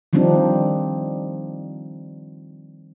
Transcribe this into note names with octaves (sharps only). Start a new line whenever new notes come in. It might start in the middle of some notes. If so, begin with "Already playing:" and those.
D#3 F3 G3 C4 D4 D#4